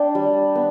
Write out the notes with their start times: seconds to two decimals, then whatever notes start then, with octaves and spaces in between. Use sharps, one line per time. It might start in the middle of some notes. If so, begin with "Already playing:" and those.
Already playing: D4 G5
0.15 G3
0.55 B3